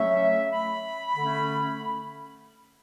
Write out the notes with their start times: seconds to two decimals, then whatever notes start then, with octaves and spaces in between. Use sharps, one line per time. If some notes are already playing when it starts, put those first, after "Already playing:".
Already playing: C#3 F#3 A3 C#4 E5
0.51 B5
1.16 D3 A3 C#4